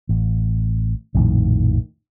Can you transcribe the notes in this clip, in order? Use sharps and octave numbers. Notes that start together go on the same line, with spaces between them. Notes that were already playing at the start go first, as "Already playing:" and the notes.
A1
A#1 F2 A2 D#3